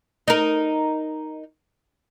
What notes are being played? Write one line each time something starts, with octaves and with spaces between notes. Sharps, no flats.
D#4 A#4